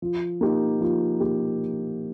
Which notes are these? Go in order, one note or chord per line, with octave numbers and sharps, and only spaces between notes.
F3
A#3 D#4 G4
F3
A#3 D#4 G4